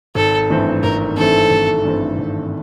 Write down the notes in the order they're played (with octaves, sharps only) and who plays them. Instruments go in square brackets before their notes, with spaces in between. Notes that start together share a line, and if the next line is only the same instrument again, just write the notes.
[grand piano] G#1 [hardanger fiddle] A4
[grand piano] G2 E3 A3 C4
[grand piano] G#1 [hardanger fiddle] A#4
[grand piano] G2 E3 A3 C4 [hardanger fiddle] A4
[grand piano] G#1
G2 E3 A3 C4
G#1